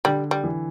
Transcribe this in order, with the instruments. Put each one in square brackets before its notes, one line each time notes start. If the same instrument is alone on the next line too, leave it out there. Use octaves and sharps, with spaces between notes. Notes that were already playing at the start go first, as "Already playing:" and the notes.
[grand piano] D3 [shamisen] G3
[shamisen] G3
[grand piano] E3